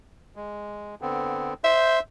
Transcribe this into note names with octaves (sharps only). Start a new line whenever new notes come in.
G#3
D3 B3 C4
C5 E5 C6 G6